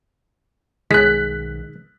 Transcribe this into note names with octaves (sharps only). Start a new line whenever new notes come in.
B1 D#3 G#3 F#6 B6